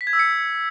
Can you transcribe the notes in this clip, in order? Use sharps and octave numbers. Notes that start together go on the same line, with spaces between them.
B6
G#6
E6
C#7